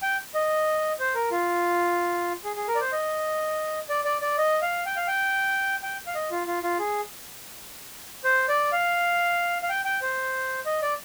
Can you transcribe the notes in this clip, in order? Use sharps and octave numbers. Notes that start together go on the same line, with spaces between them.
G5
D#5
C5
A#4
F4
G#4
G#4
A#4
D5
C5
D#5
D5
D5
D5
D#5
F5
G5
F5
G5
G5
F5
D#5
F4
F4
F4
G#4
C5
D5
F5
F5
G5
G5
C5
D#5
D5